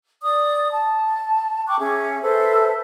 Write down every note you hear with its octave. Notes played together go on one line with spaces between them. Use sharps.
D5 D#6
A5
G5 C#6 D6 F#6
C#4 G#4 E5
A4 B4 C5 E5